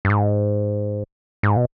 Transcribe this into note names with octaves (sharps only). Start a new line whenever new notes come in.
G2
G#2
G#2
B2